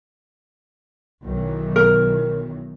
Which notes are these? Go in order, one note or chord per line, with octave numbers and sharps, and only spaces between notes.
B1 D#3 E3
A#4